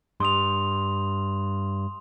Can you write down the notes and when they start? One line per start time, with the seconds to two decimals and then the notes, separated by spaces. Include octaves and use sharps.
0.20 G2 C6 D#6 F7